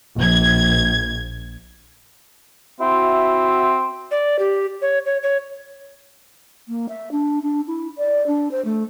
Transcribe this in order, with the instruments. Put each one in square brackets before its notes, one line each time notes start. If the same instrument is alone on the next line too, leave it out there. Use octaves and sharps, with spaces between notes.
[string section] A#1 G#6
[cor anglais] C4 [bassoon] E4 [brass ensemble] F#4 E5
[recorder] D5
G4
C#5
C#5
C#5
[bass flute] A#3
E5
D4
D4
E4
D5
D4
C5
A3